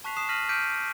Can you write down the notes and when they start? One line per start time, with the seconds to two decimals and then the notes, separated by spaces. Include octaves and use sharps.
0.04 A5 C#6 F#6 B6 C7 F7
0.17 D#6 F#6 C7 E7
0.29 F6 A#6 B6 D#7 F#7
0.49 D6 F6 G6 B6 D7 D#7